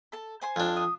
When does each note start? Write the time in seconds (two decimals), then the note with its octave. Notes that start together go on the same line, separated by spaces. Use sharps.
0.12 A4 A5
0.42 C5 G#5 C6
0.56 F2 D4
0.77 D#6